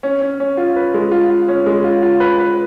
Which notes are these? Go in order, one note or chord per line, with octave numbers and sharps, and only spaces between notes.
C#4
C#4
C#4
F4
B4
G#3
F4
F4
C#4
G#3
F4
F4
B4
B4